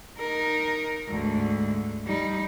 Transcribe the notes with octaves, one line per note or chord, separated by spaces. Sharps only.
D#4 A#4
D2 G#2
G3 D#4